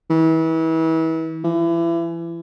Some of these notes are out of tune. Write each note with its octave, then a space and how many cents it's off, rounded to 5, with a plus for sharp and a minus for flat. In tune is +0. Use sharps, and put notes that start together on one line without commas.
E3 -35
E3 +30